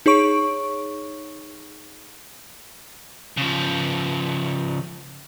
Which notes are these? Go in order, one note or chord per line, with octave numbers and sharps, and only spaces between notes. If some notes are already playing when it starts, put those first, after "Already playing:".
D#4 G#4 C#5 C#6 D7
C#3 F3